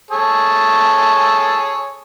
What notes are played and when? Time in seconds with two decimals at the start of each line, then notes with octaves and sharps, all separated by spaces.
0.11 G#4 A4 C#5